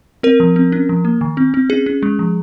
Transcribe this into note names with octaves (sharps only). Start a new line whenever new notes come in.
C4 A#4
F3
C4
C#4
F3
A#3
D#3
C4
C4
C#4 G#4
C#4
G#3
F3